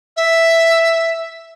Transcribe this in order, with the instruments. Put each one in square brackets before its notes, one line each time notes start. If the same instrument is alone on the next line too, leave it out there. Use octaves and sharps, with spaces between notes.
[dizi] E5